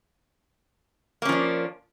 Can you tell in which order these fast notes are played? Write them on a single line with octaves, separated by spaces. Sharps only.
A#3 C#4 F3 D4